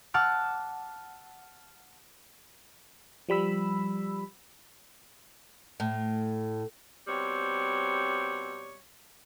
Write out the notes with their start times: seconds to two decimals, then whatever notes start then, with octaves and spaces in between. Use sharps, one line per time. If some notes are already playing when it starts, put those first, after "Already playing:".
0.14 F#5 A5 D6 E6 F6
3.29 F3 G3 B5 E6
5.80 A2
7.07 B2 G3 C4 C#5